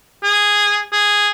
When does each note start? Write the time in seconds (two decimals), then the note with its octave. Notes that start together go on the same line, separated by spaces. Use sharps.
0.24 G#4
0.92 G#4